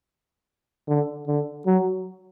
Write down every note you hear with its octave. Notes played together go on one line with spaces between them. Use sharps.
D3
D3
F#3